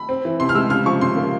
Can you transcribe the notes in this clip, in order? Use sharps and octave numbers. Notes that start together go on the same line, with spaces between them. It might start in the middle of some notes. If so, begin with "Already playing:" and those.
Already playing: B5
C4
E3
C3 C6
F6
G#3 E6
C#3 F6
F3 C#6
C#3 C6
A#3